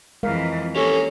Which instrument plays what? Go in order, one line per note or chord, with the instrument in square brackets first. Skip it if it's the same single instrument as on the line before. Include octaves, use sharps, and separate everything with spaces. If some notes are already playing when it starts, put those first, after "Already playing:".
[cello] F2 E3 [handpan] G#3 A#4 F5
[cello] A#3 [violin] C#4 [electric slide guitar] G4 A4